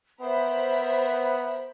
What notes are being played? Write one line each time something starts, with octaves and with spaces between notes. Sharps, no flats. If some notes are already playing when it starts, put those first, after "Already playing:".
B3 A#4 C5 E5 B5